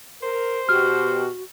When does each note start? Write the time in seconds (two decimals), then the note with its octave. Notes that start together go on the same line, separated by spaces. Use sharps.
0.23 A#4 C5
0.69 B2 F#4 G4 F6